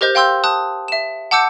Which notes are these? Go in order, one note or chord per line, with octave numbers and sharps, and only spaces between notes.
G4 A#4 C5 D#5 G6
F5 G5 C6 E6 G6
A5 D#6 F#6
E5 E7
F#5 A5 D6 E6 G6 C#7